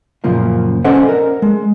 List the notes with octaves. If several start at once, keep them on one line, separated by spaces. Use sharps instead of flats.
F#2 A#2 C#3 F3 A#3
C#4 A4 C5 D5 D#5 F#5
A#4
G#3